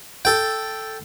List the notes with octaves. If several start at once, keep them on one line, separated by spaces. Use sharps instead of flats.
A4 G5